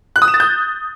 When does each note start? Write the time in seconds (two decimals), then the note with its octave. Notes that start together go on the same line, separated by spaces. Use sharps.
0.16 F#6
0.22 D#6
0.28 E7
0.34 A6
0.40 G6